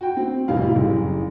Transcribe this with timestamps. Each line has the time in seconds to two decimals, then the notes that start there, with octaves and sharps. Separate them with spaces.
0.01 F#4 G5
0.17 C4
0.48 F1 A2 G3 D#4 F5
0.61 G3 E4
0.76 F#1